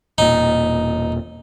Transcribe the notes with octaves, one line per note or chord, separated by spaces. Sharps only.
E1 A#2 D#4